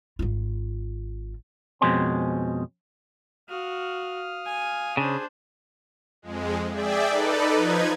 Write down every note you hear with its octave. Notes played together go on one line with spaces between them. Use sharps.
G#1 F4
F2 B2 G#3 C4 C#4 C6
F#4 F5 D#6 F6
G#5
C#3 D4 G#4 C5 G#5
F2 G#3
G#4 D5 E5 G5
D#4 A4 B4 D5
F3 D#4 B4 G#6